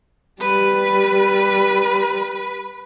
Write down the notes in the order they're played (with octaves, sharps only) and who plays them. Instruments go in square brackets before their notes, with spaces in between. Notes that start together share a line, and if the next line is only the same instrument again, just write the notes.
[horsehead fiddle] G3 [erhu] B4